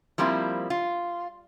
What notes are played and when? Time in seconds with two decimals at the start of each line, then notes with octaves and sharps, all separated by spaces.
0.18 F3 G3 A#3 C4 E4
0.70 F4